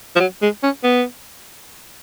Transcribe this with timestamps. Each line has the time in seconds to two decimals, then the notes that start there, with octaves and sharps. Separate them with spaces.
0.16 F3
0.20 F#3
0.42 G#3
0.63 C#4
0.84 B3